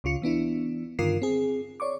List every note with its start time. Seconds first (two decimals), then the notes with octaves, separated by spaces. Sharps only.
0.04 C#2 C#3 F4 C#7
0.22 E3 B3 D4 E4
0.99 G2 D3 D#3 F4 A#4 C7
1.22 C4 G#4
1.80 C#5 D5 C#6 D6